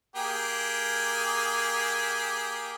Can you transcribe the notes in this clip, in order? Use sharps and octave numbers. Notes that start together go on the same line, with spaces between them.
A#3 G4 G#4